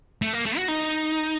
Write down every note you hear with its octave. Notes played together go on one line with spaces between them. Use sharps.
A3
A#3
A3
F#4
D#4